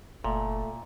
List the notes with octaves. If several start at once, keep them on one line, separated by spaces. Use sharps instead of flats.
F#1 A#2 A3